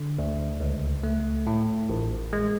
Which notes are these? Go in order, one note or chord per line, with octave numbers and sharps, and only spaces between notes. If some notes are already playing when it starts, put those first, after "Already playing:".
Already playing: D3
D2
C#2
A3
A2
A1
G#3